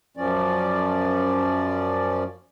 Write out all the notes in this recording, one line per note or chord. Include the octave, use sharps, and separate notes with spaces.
F#2 F3 C#4 D5